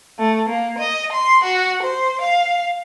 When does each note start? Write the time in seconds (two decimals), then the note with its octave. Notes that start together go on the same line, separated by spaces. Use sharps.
0.19 A3
0.49 A#3
0.79 D#5
1.13 C6
1.44 F#4
1.83 C5
2.22 F5